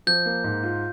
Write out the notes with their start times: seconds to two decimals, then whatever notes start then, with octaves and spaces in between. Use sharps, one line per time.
0.07 F3 G6
0.26 A#3
0.44 G#2
0.63 F4